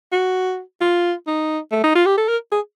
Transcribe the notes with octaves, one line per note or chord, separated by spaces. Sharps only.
F#4
F4
D#4
A3
D#4
F4
G4
A4
A#4
G#4